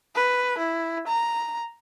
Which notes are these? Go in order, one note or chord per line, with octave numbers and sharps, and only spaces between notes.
B4
E4
A#5